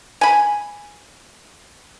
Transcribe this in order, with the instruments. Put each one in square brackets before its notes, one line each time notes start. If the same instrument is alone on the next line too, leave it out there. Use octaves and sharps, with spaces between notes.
[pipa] G#5 B5